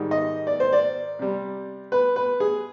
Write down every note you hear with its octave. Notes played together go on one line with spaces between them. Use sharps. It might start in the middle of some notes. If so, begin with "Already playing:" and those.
Already playing: G#2 D#3 G3
D#5
D5
C5
D5
C3 G3
B4
B4
G#4